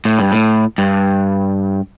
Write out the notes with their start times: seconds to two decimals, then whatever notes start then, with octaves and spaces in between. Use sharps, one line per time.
0.05 A2
0.19 G2
0.32 A2
0.78 G2